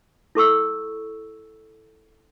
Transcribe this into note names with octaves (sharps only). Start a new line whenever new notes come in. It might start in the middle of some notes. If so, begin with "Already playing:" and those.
E4 A4 C#6 E6